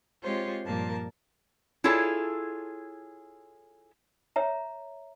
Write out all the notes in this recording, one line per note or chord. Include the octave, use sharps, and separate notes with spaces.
G#3 C4 F4 G4 C5 C#5
G2 A#2 F3 A#3 A#4 A5
E4 F4 G#4 A4 C#5
C#5 E5 A#5